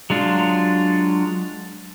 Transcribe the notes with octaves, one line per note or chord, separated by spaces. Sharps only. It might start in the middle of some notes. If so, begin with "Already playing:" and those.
F#3 G#3 D4 F4